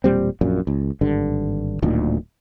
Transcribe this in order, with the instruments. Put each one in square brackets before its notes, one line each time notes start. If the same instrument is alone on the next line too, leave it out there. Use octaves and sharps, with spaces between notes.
[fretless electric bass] E1 A#2 G3 C4
A#1 F#2 A#2
C#2
G#1 G2 D3
D1 D2 A#2 D#3